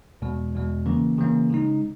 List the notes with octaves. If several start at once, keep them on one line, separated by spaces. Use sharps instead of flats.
E2 B2 G#3
E2 B2 G#3
C#3 E3 A#3 C#4
C#3 E3 A#3 C#4
C#3 G#3 D#4